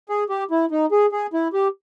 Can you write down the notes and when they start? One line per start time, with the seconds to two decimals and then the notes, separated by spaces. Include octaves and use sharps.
0.09 G#4
0.30 G4
0.51 E4
0.71 D#4
0.92 G#4
1.12 G#4
1.34 E4
1.53 G4